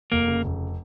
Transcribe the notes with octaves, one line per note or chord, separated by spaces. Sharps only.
F1 A#3
C#3
F1